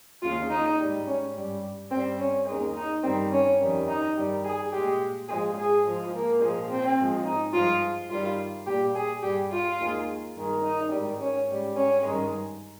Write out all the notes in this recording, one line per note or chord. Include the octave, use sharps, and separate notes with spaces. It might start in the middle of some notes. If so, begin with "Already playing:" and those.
D#2 C#3 G#3 F4
D#4
G#2 G3
C#4
G2 G3
G2 G3 C4
C#4
D#2 D#3 G#3
D#4
G2 D#3 G3 C4
C#4
F2 D#3 G3
D#4
G2 D#3 G3
G#4
A#2 G#3 G4
G#2 F3 G#3 G#4
G#4
G#2 F3 G#3
A#3
A#2 F3 G#3
C4
G#2 F3 G#3
D#4
G2 F3 G#3 F4
G2 D#3 G3 F4
A#2 G3 G4
G#4
G2 G3 G4
F4
D#2 D#3 G#3
G2 D#3 G#3
D#4
G#2 D#3 G3
C#4
G#2 G3
C#4
G2 D#3 G#3